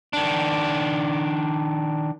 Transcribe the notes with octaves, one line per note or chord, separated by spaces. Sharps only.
D#3 D4